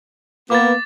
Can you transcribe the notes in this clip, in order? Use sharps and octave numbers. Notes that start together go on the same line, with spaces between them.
A#3 B3 D6 A6